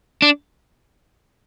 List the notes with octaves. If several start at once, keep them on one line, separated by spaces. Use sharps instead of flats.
D4